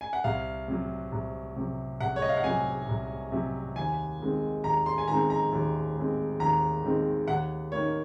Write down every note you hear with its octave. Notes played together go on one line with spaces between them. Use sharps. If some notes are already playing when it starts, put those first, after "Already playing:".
G#5
F#5
C2 F5
C3 F#3
C2
C3 F#3
C2 F#5
C#5
D#5
F5
F#5
C3 F#3 G#5
C2
C3 F#3
D#2 G#5
D#3 G#3 C4
D#2 A#5
C6
G#5
D#3 G#3 C4 A#5
A#5
D#2
D#3 G#3 C4
D#2 A#5
D#3 G#3 C4
D#2 F#5
D#3 A#3 C#5